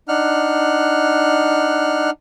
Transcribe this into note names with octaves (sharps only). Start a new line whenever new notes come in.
D4 D#4 F#5 F6 F#6